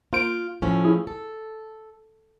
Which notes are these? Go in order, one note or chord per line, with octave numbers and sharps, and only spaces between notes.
A#3 F4 C5 D7
A2 F3 C#4
E4 G#4
A4